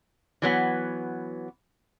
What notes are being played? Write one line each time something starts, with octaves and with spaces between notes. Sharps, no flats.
E3 F#3 B3